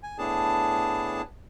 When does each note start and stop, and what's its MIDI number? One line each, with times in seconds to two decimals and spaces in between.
0.03 0.18 80
0.19 1.22 45
0.19 1.22 59
0.19 1.22 62
0.19 1.22 68
0.19 1.22 81